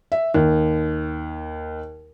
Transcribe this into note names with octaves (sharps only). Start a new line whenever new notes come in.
E5
D#2